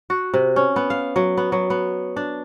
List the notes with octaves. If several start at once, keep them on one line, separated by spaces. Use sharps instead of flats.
F#4
C3
C#4
B3
F5
F#3
B3
F#3
B3
D4